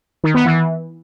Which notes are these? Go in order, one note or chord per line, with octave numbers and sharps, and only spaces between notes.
D#3
B3
E3